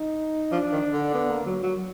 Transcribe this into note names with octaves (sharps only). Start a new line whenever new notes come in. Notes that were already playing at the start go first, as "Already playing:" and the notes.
Already playing: D#4
F3 D4
D#3
D3
B3
A#3
F#3
F#3